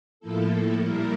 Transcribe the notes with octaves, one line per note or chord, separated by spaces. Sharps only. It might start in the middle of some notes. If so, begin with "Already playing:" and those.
A2 F3 A#3 E4 A4
A#2 G3 A#3 E4 A#4